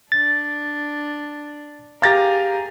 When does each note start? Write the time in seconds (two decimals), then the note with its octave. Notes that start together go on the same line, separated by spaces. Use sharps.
0.12 D4 A6
2.02 G4 G#4 A#4 F5 A#5 A6 A#6